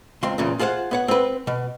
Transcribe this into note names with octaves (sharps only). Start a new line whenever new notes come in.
C#2 C4 C6
E2 A#2 C#3
F4 G#4 C5 F5 F#5
B3 C#5 F#5
C4 B4
B2